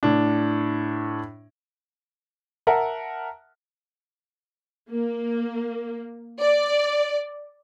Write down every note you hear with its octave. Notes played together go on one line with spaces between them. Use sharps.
A2 D4
A#4 E5 F#5 A5
A#3
D5